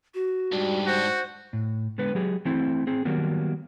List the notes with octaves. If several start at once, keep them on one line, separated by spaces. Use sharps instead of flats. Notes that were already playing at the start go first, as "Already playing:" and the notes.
F#4
G#2 G3 D4
F#4 C5
A2
D3 G#3 B3 B4
F#3 G4 G#4
E3 A3 C4 E4
C4 G#4
D#3 F#3 G3 A#3 B3